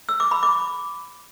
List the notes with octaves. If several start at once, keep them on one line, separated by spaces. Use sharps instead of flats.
E6
D6
B5
D6